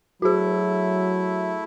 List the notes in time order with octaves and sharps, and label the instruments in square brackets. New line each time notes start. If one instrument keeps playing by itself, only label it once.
[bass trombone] F#3 [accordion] A3 E4 [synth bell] F#4 G#4